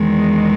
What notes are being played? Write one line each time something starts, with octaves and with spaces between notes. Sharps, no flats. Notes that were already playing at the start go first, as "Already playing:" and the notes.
Already playing: E2 D#3 G#3